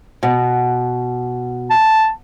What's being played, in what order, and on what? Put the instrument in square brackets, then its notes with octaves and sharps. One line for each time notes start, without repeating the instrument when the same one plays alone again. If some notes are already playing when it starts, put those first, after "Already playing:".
[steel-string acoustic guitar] B2
[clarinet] A5